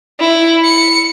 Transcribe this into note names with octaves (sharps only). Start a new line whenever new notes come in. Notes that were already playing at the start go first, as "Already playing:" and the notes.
E4
C#7